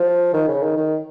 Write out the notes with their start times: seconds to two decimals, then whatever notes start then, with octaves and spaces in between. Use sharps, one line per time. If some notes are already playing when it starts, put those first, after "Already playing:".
Already playing: F3
0.34 D#3
0.48 C#3
0.63 D#3
0.76 D#3